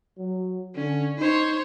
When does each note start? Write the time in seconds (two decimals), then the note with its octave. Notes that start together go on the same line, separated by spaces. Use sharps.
0.18 F#3
0.75 D3 C#4
1.18 D#4 C5 C#5